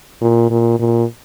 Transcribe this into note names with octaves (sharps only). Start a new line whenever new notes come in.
A#2
A#2
A#2